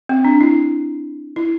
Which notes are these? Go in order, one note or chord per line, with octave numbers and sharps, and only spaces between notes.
C4
D4
E4
E4